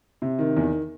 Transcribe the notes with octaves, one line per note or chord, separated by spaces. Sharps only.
C3
D#3
E2